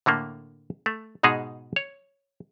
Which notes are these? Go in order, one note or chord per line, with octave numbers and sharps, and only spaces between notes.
A2 D3 A3 A#3
A3
G#2 B2 G#3 D#4 G#4
C#5